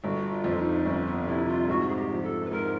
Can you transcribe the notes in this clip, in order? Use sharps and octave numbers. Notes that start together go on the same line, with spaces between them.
G1 F#4
F4
F2
D#4
G1 C#4
B3
C3 E4
F4
G#2 F#4
G#4
G4
F3
A4
B4
G#2 A#4